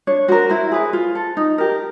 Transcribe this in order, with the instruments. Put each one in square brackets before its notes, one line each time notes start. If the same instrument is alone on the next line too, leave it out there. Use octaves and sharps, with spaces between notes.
[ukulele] D4 C#5
F#4 A#4 C5
E4 C5
G#4 B4
F4
A4
D#4
G4 A#4